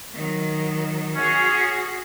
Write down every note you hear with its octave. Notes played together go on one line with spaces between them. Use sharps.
D#3 F#3
C#4 F#4 G#4